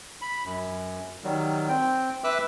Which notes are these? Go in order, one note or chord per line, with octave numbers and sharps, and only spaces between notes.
B5
F#2
D#3 F#3 G3
C4 G5
B4 E5 D6 E6 F#6